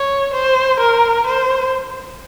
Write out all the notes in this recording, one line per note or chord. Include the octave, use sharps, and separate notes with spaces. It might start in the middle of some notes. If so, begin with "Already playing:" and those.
Already playing: C#5
C5
A#4
C5